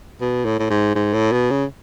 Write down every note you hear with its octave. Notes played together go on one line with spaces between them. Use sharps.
B2
A2
A2
G#2
G#2
A2
B2
C#3